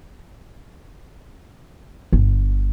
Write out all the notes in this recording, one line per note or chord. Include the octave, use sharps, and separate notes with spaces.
G1